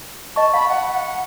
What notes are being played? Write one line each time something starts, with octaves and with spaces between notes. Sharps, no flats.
D#5 A5 C#6
F5 B5
F#5
F#5